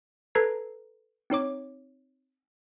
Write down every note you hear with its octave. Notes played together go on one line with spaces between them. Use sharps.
A4 B4 A#5 G#6 C7
C4 D#4 C#5 D6